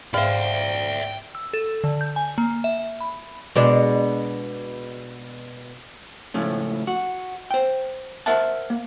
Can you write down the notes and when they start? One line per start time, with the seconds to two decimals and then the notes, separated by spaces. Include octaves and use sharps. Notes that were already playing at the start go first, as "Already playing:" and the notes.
0.14 G#2 C5 D5 E5 F5 G5
1.35 E6
1.53 A4
1.84 D3
2.01 G6
2.16 G#5
2.38 A#3
2.64 E5
3.01 B5
3.56 B2 G#3 D4
6.34 C#2 A2 F3 A3 C#4
6.87 F#4
7.51 C5 G5
8.26 A#4 C5 E5 F#5 A5
8.70 A#3